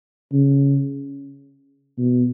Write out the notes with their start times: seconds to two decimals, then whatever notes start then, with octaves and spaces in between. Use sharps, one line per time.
0.32 C#3
1.98 B2